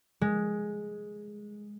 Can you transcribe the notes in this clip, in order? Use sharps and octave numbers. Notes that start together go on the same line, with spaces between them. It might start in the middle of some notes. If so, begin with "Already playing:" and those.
G#3